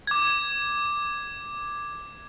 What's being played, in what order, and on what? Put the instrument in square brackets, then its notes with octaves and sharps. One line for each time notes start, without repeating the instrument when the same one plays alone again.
[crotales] D6 G#6